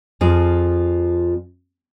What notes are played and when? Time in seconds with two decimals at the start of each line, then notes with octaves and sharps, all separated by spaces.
0.21 F2 F3 G#4